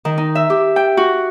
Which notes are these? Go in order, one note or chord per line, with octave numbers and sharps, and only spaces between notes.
D#3
D#4
E5
G4
G5
F#4